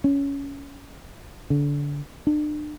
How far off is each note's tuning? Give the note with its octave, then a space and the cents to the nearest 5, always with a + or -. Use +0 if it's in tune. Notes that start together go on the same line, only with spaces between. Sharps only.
C#4 +15
D3 -25
D4 +40